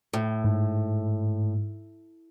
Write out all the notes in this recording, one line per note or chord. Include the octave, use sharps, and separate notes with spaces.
A2
G#2